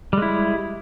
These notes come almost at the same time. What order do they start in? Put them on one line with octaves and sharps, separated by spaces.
G3 G#3 E4